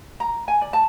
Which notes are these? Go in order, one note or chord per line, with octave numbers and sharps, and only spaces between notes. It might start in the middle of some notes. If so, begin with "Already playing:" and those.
A#5
G#5
D5
A5